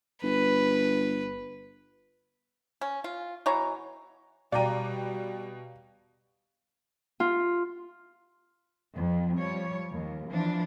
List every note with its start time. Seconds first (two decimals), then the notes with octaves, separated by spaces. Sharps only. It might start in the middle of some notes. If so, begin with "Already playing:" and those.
0.23 G1 B4
2.81 C#4
3.04 F4
3.46 B2 E3 C#5 A#5
4.52 B2 G3 D5 F5 G5 A#5 D#7
7.20 F4
8.95 F2 F3
9.38 F3 G3 C#5
9.92 D#2
10.29 E3 F3 D4